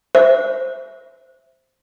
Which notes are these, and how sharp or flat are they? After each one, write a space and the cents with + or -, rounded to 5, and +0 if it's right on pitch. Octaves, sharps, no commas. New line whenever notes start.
C5 +0 E5 +0